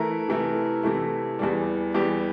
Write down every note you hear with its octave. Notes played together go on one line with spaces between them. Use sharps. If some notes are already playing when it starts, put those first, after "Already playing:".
Already playing: E3 A3 E4 A#4
C3 E3 A3 E4
C3 E3 A3 E4
E2 E3 G3
E2 E3 G3 G4